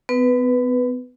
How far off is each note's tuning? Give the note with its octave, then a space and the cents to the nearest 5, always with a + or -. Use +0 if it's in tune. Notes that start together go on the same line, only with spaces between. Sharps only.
B3 +40 B4 +0